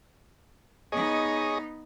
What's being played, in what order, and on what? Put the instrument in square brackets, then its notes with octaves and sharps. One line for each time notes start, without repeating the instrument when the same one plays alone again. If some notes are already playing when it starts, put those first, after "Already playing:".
[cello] B3 D#4 [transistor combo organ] G#4 C#5 D#5